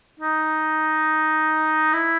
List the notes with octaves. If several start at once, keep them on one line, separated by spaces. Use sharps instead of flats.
D#4
E4